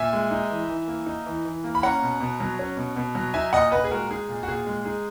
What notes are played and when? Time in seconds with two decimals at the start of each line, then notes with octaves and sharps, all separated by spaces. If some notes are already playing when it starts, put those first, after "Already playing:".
Already playing: A#2 E5 G#5
0.13 G#3
0.31 D#4
0.50 E3
0.69 E3
0.88 A#3
1.06 D#4
1.26 E3
1.45 E3
1.64 A#3
1.75 B5
1.83 C#4 F#5 A#5
2.02 B2
2.20 B2
2.40 F#3
2.59 C#4
2.77 B2
2.96 B2
3.15 F#3
3.34 D#4 E5 G#5
3.53 A#2 D#5 F#5
3.72 A#2 B4 D#5
3.84 G#4
3.91 G#3 F#4 A#4
4.11 D#4 G#4
4.29 A#2
4.43 F#4
4.48 A#2 G#4
4.66 G#3
4.85 D#4 G#4